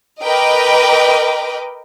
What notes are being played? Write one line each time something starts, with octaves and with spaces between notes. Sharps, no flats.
A#4 B4 D#5 G5 D6